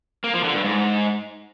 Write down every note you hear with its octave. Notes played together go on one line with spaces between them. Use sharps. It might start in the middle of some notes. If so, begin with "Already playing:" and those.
A#3
F3
D3
G2
G#2